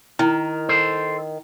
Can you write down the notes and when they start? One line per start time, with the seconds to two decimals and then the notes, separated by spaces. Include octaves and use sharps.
0.19 D#3 E4
0.69 A4 C5